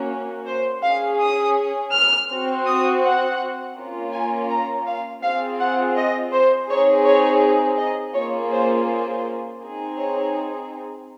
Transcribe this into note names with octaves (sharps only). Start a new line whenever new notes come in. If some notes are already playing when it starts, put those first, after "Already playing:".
Already playing: A#3 C#4 F#4
C5
C#4 G#4 F5
D#6
F6
C4
F#4
D#6
F#5
A#3 C#4 F4
G#5
A#5
F5
C4 F4 G#4 F5
F#5
D#5
C5
C4 D#4 G#4 C#5
C#5
D#5
A#3 C#4 F4 G#4 C#5
C5
C5
C4 D#4 G#4
C#5